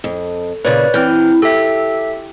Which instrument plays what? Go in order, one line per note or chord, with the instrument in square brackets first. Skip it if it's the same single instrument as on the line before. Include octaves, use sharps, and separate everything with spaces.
[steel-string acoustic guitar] F2
[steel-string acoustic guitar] A#2 C#3 [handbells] B4 C#5 D5
[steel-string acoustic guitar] E3 [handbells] C4 F6 G6
[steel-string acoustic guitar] G4 [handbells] A4 E5